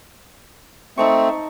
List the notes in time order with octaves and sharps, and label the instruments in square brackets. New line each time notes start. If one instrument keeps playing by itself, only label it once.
[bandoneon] A3 C4 [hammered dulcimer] D#4 A5 C#6